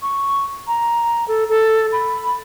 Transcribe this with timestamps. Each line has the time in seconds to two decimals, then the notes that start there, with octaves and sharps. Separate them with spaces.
0.02 C#6
0.67 A#5
1.28 A4
1.49 A4
1.92 B5